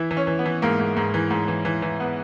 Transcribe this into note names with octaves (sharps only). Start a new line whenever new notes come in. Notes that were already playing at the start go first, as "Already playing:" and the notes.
Already playing: E3 E4
E3
C#4
E3
B3
E3
G#2 A#3
G#2
G#2
E3
G#2
E3
E3
E3
B3